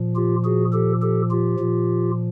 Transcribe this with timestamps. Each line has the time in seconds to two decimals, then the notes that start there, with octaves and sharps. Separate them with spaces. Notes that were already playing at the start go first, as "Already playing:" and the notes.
Already playing: A#2 F3
0.16 F4 G4
0.45 F#4 G#4
0.73 G4 A4
1.02 G4 A4
1.30 F4 G4
1.59 A#2 F3